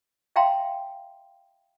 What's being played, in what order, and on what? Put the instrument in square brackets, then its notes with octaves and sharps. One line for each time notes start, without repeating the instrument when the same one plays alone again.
[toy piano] E5 F5 G5 A#5 C6